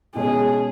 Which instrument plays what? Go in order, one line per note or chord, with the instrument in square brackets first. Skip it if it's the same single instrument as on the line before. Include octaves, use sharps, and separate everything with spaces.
[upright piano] B2 G#3 C#4 [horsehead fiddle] G#4